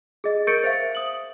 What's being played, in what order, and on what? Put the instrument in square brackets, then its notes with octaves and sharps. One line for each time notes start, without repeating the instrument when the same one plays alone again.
[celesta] G#4 D#5
A#4 C#6 G6 A6 C#7 D7
C5 E5 F5
D#6 F#7